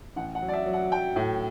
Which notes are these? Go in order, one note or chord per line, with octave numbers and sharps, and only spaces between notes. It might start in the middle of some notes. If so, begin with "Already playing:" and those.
A1 F#5
F#5
F#3
D5
E5
F#3
F#5
F#3 G5
A2